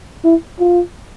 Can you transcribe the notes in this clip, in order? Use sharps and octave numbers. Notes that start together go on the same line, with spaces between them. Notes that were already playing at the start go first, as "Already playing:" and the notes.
E4
F4